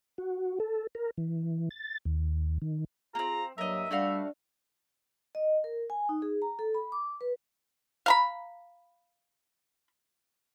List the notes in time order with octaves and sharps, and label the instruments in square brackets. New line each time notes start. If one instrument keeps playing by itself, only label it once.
[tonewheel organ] F#4
A4
A#4
E3
A6
D#2
D#3
[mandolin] A#3 C4 [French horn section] F4 G#4 [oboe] A#5
[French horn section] G2 A#3 [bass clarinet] F#3 [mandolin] A#4 D#5 [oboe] E5
[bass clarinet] G3 [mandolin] A3 F#4 F5 [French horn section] D4
[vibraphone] D#5
A#4
G#5
D#4
G#4
A#5
A4
B5
D6
B4
[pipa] F5 A#5 B5